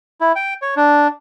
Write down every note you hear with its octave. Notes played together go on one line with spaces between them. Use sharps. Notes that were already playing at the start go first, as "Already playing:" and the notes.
E4
G5
C#5
D4